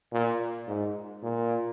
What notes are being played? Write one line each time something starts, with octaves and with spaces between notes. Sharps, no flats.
A#2
G#2
A#2